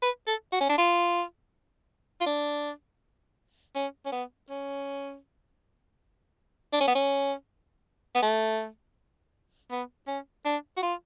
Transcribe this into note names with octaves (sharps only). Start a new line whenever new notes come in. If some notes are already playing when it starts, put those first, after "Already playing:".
B4
A4
F#4
C#4
D4
F4
F4
D4
C#4
C#4
B3
C#4
D4
C#4
B3
C#4
B3
A3
B3
C#4
D4
F#4
F4